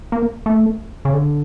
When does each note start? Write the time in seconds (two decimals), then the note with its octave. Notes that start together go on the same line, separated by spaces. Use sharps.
0.12 A#3
0.46 A3
1.05 C#3
1.14 D3